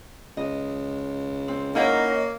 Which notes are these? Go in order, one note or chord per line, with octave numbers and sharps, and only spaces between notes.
C#2 D#5
C4
A#3 C#4 D#4 E4 D#5 F#5